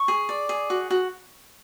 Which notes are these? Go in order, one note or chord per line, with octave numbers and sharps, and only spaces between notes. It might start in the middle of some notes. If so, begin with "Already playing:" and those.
Already playing: C#6
G#4
D5
G#4
F#4
F#4